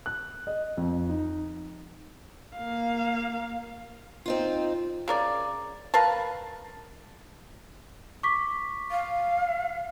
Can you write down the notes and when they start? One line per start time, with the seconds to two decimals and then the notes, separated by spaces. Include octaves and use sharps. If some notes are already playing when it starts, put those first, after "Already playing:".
0.06 F#6
0.47 D#5
0.77 F2
1.09 D#4
2.57 A#3 F5
4.26 C4 D#4 F4
5.08 C#3 A#4 D5
5.94 A#4 B4 F5 A5
8.23 C#6 D6 B6
8.91 F5